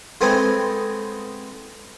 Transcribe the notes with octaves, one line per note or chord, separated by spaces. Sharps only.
G#3 A3 B3 C4 G#4